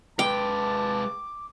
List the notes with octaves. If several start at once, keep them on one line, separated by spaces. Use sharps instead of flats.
G#3 B4 G5 A5 D6